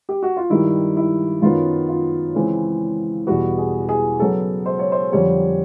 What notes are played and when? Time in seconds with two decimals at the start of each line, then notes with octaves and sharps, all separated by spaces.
0.09 G4
0.23 F#4
0.37 F4
0.50 G2 D#3 G3 E4
0.97 E4
1.42 F#2 D#3 F#3 B3 F4
1.89 F4
2.35 C#3 E3 G#3 C4
3.27 E2 B2 G3 B3 F#4
3.58 G#4
3.89 G#4
4.19 C#3 F#3 B3 A4
4.66 C5
4.79 C#5
4.92 C5
5.12 F2 D3 G3 C4 C#5